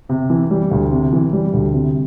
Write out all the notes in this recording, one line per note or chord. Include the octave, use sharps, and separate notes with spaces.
C3
E3
G3
D2
C3
E3
G3
D2
C3